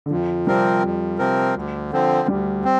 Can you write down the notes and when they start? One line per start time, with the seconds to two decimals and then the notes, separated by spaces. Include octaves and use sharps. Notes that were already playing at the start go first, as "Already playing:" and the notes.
0.06 D3
0.11 F2 F3
0.47 C3 F3 G3 C4 A#4
0.83 F2
1.19 C3 F3 C4 A#4
1.55 D2
1.91 D3 F3 C4
2.28 D2 G3
2.64 C4